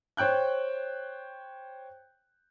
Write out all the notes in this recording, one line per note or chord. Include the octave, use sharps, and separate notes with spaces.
C5 C#5 G5 F#6 G6